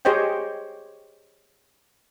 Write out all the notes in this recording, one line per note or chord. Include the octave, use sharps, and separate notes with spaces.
G4 G#4 C5 C#5 D#5 G5